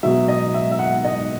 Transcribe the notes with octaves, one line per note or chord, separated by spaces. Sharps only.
B2 F#3 E5
D#5
E5
E5
F#5
D#5